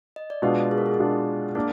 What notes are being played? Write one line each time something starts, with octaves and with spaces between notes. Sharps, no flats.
D#5
D5
B2 G#3 D4 F4 B4
G#4
A#4
G#4
B2 G#3 D4 F4
A#3 D4 A#4